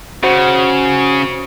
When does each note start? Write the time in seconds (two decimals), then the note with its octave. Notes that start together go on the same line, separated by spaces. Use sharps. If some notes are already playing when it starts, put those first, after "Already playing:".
0.24 C#3 F#4 C5